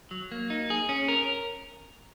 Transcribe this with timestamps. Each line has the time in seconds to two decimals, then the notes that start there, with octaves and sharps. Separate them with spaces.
0.11 F#3
0.32 A#3
0.50 D#4
0.70 G#4
0.89 C#4
1.08 A#4